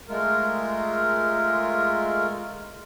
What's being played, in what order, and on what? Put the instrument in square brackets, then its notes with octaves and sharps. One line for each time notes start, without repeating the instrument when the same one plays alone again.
[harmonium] G#3 A3 F4 A#4